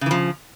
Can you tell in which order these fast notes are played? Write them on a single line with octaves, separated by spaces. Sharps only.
C#3 E3 F3